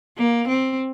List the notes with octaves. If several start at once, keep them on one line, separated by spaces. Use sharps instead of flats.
A#3
C4